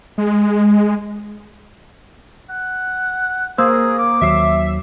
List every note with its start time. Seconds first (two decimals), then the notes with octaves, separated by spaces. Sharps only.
0.18 G#3
2.50 F#5
3.58 A#3 G#4 C5 E6
3.99 D6
4.21 D#2 F#3 E5 C7